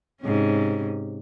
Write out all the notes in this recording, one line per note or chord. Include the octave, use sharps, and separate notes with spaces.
G#2 C3 C#4